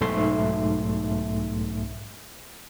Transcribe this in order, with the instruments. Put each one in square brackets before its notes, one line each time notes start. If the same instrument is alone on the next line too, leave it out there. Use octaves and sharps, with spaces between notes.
[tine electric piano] B1 G#2 A3 E5 C6 C7